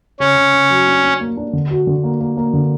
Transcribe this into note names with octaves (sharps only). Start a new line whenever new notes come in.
C#3 C#4
C#3
C#3
F#3
D4
D4
A#3
D4
D3
F#4
D3
A#3
A#3
A#3
D3